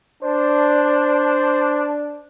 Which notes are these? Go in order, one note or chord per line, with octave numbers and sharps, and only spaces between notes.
D4 C5